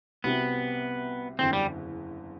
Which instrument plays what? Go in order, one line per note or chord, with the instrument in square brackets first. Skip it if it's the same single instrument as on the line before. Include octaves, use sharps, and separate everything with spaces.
[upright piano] C2 C3 G3 C4 F#4 [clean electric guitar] B3
[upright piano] F#1 E2 D3 [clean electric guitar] C4
[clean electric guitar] G3